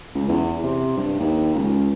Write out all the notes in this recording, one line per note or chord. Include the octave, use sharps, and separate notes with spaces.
C#2
E2
C3
G2
D#2
C#2